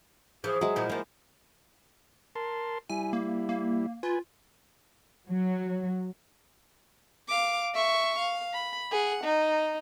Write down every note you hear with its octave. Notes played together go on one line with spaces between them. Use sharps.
E3 F3 G#4
F#3 G#3 E4
A#2 F3 E4
F3 G#3 A#3
A#4 A5 C6
G3 E4 G#5
A#3
A#3
F4 B4 G#5
F#3
F5 D6
E5 C#6
F5
B5
G#4 F#5
D#4